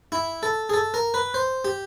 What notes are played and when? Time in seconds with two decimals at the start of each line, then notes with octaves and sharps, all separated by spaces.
0.12 E4
0.43 A4
0.70 G#4
0.74 A4
0.94 A#4
1.14 B4
1.34 C5
1.65 G4